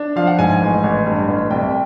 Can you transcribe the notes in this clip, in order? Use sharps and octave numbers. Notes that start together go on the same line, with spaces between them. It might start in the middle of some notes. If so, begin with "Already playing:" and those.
Already playing: D4
F3 F5
F#5
G#2 G#5
G#5
A1
A1
G2
A1
C2 G5